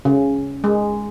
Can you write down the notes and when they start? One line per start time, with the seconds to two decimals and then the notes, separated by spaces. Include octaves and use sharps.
0.05 C#3
0.64 G#3